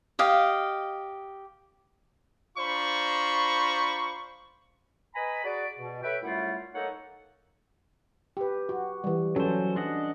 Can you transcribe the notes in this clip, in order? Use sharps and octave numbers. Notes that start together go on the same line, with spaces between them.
G4 D#5 F5
D4 F4 C5 A#5 B5 C#6
B4 D#5 G#5 A#5 B5
F#4 G#4 D5
B2
A4 B4 C#5 E5 G5 B5
F#2 G3 A3 E4 F4 F#5
A#3 D#4 A4 C#5 D#5 F#5
G4 B4
F#4
E3 G3
F#3 C#4 A4 C5
D4 D#5 F#5